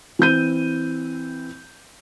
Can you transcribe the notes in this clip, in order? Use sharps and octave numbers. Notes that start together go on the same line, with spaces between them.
E3 C4 G6 D#7